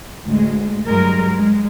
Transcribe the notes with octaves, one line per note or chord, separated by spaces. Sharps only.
D2 A2 G#3
G2 F#3 G#3 A#4
G#3